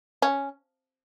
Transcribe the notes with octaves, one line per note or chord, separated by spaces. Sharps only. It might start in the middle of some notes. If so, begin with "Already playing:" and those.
C#4